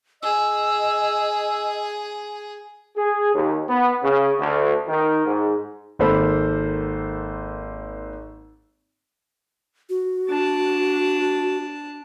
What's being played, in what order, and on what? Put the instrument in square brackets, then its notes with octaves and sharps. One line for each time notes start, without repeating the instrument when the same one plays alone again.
[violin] G#4 [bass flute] D#5 [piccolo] E6
[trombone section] G#4
D#2
B3
C#3
D2
D#3
G#2
[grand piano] G#1 A#3 A4 C5 B5 E6
[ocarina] F#4
[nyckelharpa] D4 A5